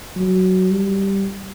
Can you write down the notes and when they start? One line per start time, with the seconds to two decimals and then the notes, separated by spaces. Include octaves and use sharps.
0.16 F#3
0.71 G3